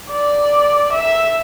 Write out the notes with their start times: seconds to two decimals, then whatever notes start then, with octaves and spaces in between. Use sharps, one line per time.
0.11 D5
0.93 E5